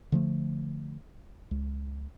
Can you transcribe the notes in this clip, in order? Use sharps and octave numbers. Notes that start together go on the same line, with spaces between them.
D3 F3 A3
C#2